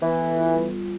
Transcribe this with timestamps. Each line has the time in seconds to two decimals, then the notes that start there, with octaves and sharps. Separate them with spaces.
0.01 E3 B3
0.18 A4
0.36 F4
0.53 G3
0.71 F4